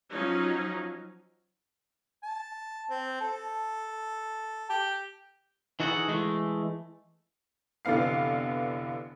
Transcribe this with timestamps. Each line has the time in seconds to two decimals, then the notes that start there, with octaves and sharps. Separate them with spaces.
0.11 F3 F#3 C#4 D#4
2.23 A5
2.90 C4
3.21 A4
4.70 G4
5.80 E3 D#4 F#4 G#4 A4 F#5
6.08 E3 G#3 A3
7.85 F1 D3 E3 B3 F5 C7